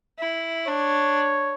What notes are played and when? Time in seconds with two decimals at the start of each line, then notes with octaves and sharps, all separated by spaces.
0.19 E4
0.67 D4 C#5